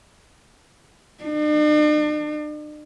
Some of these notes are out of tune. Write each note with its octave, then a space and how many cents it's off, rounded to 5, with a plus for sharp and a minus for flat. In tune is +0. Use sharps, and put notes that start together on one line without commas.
D4 +45